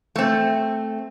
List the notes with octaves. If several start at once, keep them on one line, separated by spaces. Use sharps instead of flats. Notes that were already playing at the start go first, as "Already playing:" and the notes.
A3 C4